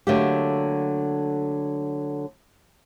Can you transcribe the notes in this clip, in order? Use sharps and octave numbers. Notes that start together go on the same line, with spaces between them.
D3 F#3 A3 A#3 G4